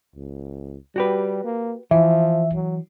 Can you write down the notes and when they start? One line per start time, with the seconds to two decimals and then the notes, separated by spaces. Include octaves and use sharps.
0.16 C#2
0.96 G3 F#4 G4 B4
1.44 A#3
1.91 E3 F3 E5
2.54 F#3